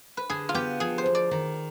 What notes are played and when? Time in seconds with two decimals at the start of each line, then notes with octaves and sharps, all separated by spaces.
0.17 B4
0.30 D3 G#4
0.49 F4
0.54 B3 G4
0.80 F3 G#4
0.98 C5
1.06 D2
1.15 D5
1.31 D#3